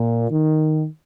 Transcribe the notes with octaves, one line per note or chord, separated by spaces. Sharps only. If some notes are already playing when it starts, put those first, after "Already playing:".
Already playing: A#2
D#3